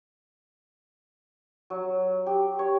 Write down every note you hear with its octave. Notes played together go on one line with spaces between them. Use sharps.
F#3
G4
C#5